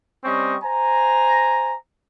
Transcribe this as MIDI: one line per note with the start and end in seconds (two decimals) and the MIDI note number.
0.24 0.57 55
0.24 0.57 60
0.24 0.57 61
0.24 0.57 75
0.24 0.57 85
0.64 1.75 72
0.64 1.75 80
0.64 1.75 82